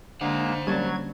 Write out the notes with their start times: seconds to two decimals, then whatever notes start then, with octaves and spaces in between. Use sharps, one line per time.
0.21 D3 G#3 A#3 D4 C5 F#5
0.67 F#3 G3 A#3 C#4 A5 G#6